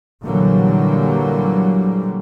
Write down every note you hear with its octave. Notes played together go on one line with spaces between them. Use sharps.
A#2 D3 E3 F#3 G3 A#3